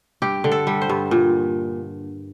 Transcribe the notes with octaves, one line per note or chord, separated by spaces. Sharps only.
G2 G4
D3
A4
G3
C5
G2
A#2